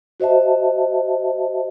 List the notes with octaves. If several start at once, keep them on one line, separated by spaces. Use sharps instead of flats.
F#4 C5 D#5 E5 A5